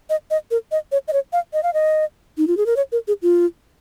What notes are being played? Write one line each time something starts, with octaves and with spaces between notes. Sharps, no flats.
D#5
D#5
A#4
D#5
C#5
D#5
C#5
F5
D#5
F5
D#5
D#4
F4
G#4
A#4
C#5
A#4
G#4
F4